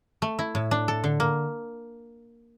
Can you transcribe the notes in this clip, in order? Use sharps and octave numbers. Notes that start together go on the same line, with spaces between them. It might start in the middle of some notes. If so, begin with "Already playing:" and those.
A3
E4
A2
D4
A4
D3
A#3